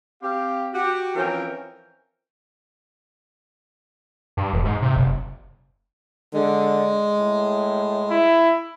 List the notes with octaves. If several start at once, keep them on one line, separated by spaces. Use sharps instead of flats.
C4 G4 F5
F#4 G4
E3 F3 C4 C#4 A#4 G5
G2
E1
G#2
C3
F#1
D3 G#3
A2
E4